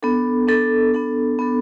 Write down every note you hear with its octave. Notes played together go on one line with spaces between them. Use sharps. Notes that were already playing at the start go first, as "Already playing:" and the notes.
B3 D4 A4
B3 D4 A4
B3 D4 A4
B3 D4 A4